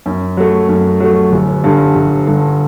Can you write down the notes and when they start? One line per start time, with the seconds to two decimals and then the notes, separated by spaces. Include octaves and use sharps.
0.06 F#2
0.37 F#3 A3
0.69 F#2
1.00 F#3 A3
1.32 G1
1.64 G2 D3
1.95 G1
2.27 G2 D3